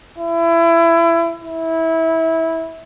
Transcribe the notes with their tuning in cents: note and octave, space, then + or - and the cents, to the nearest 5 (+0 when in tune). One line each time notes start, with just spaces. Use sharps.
E4 +25
E4 -20